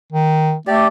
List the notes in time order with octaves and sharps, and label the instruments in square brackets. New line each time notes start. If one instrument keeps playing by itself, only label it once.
[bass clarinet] D#3
[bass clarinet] A3 [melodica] G4 D5